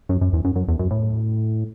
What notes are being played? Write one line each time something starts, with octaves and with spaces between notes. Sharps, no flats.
F#2
F#2
E2
F#2
F#2
E2
F#2
A2